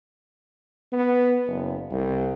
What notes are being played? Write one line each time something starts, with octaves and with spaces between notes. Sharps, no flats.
B3
F#1
C2